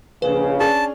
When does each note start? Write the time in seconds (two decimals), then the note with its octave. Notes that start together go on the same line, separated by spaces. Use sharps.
0.22 A#1 C#3 B4
0.60 C#4 D4 G#4 A5